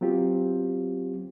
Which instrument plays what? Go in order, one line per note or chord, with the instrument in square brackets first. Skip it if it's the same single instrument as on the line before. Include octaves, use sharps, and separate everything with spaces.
[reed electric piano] F#3 B3 C4 F4 G4